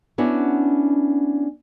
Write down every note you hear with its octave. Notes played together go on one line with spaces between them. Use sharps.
B3 C#4 D4 E4 F#4